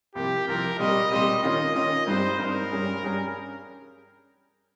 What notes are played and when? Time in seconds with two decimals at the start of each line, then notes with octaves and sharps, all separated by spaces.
0.15 C2 C3 F3 A#3 G4
0.48 C2 C3 F3 A#3 A#4
0.79 A#2 G3 C4 G4 D#5
1.11 A#2 G3 C4 G4 D#5
1.43 D#3 A#3 C#4 F4 D#5
1.75 D#3 A#3 C#4 F4 D#5
2.07 G2 G3 C4 D#4 C5
2.39 G2 G3 C4 D#4 A#4
2.72 G2 G3 C#4 G#4
3.03 G2 G3 C#4 G#4